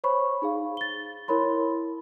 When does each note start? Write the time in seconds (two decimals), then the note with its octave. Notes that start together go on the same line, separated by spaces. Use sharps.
0.04 C5 C#5 B5 C#6
0.42 D#4 G#4 F5
0.77 A6 G7
1.28 E4 A#4 C#5 B5 C6